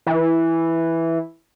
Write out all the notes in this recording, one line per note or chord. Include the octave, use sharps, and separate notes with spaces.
E3